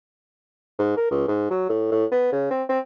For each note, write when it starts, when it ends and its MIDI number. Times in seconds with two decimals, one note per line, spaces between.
0.78 0.95 44
0.97 1.10 70
1.11 1.26 37
1.28 1.49 44
1.50 1.65 54
1.69 1.89 45
1.92 2.05 45
2.11 2.32 59
2.32 2.48 49
2.51 2.63 60
2.69 2.79 60